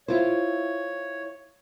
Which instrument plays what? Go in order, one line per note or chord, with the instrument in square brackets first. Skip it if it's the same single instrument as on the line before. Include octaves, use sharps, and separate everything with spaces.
[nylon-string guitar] E4 F4 C5 [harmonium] C#5